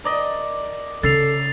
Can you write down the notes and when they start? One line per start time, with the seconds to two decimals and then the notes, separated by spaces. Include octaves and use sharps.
0.04 A#4 D5 D#5
1.03 C#3 A4 A6 C7 F7